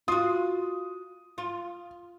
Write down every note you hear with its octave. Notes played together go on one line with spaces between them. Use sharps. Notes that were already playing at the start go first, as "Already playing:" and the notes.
F4 F#4 D#6
F4